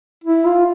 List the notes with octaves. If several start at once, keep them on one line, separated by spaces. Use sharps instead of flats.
E4
F4